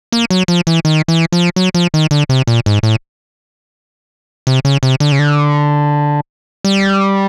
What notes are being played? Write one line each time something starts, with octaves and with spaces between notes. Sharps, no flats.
A#3
F#3
F3
E3
D#3
E3
F3
F#3
F3
D#3
D3
C3
A#2
G#2
A2
C3
C#3
C3
D3
C#3
D3
G3